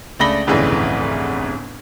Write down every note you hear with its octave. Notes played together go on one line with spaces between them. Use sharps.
C#2 A3 D4 B5 A#6 G7
G1 C2 F2 A2 C#3 E3